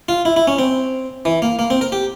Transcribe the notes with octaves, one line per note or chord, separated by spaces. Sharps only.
F4
E4
E4
C#4
C4
E3
A#3
A#3
C4
A#4
G4